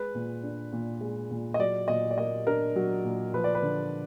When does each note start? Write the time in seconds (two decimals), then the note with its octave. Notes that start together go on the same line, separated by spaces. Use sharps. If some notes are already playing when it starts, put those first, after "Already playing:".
Already playing: G#3 B4
0.15 A#2
0.43 D4
0.72 A#2
1.01 G#3
1.31 A#2
1.54 D#5
1.59 F#3 D5
1.88 A#2 D#5
2.11 D5
2.18 A#3 D#5
2.47 D4 A#4
2.76 F#3
3.04 A#2
3.34 F3 B4
3.44 D5
3.55 B4
3.62 D3